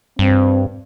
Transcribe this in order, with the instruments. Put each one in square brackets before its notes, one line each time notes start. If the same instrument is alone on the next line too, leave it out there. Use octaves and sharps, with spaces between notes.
[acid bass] G2 [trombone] C4